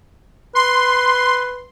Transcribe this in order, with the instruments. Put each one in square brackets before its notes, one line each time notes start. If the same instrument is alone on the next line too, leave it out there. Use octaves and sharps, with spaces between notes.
[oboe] B4 [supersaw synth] C6